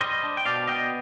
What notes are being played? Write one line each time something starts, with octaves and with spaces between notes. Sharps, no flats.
G3 C5 D#5
D4
G5
B2 D5 F5
B3 D#5 G5